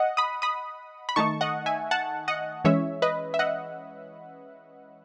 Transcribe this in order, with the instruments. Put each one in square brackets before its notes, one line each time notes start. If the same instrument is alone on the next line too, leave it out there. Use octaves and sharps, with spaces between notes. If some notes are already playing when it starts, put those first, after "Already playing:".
Already playing: [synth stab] D#5 F#5
B5 D#6
B5 D#6
B5
D#3 A3 D#4 A5 C#6
D#5 F#5
E5 G#5
F#5 A5
D#5 F#5
E3 G#3 C#4 C#5 E5
B4 D#5
E5
D#5 F#5